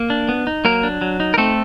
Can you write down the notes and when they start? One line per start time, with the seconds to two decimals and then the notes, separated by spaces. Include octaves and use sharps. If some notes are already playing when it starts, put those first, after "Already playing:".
Already playing: A#3
0.10 D4
0.29 B3
0.47 D#4
0.65 F#3 A#3 A#4
0.83 D4
1.01 F#3
1.20 D#4
1.34 A#4
1.38 A3 C4 A4